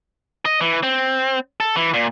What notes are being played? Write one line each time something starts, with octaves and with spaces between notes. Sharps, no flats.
D#5
E3
C4
A4
E3
A#2